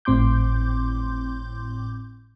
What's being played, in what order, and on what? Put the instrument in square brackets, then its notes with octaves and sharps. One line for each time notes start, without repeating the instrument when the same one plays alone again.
[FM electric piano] G#1 A2 C4 C6 D6 G6